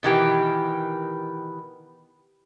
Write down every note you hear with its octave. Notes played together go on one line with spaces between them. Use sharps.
B2 D#3 E3 G4